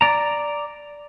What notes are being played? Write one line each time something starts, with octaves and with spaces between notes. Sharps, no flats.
D5 A#5